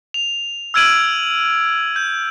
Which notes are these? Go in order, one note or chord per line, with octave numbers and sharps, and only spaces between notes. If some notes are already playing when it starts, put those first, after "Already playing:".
F7
E6 F6 G#6 D7 D#7 F#7
G6